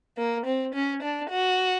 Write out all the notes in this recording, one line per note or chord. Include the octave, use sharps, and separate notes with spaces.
A#3
C4
C#4
D4
F#4